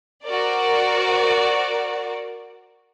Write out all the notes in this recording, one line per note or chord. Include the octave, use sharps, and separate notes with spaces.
F#4 A#4 C5 D5